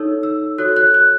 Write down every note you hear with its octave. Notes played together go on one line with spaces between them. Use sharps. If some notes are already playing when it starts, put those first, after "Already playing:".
Already playing: D#4 A4 C#5 E6
E6
F#4 A4 C#5 F#6
F#6
F#6